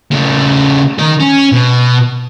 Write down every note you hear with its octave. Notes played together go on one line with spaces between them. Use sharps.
C#3 A3
D#3 A#4
C#4
B2